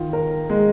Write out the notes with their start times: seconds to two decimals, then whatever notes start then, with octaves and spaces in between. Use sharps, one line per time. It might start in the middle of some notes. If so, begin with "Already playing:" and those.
Already playing: D#3 F4
0.13 A#4
0.50 G#3